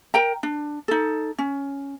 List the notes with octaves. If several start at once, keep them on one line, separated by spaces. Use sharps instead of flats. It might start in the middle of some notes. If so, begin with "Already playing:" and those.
A#4 G5 A#5
D4
D#4 A4
C#4